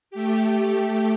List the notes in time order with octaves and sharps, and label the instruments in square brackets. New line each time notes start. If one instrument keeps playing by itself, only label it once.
[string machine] A3 G4